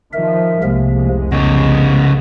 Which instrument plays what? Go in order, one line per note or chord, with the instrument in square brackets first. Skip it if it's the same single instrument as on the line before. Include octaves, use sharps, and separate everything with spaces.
[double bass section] D#3 F3 [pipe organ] A#4 E5
[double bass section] F1 C2 G#3 [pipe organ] C3 F3 A#3
[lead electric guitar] C#3 D#4 [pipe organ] B3 D#5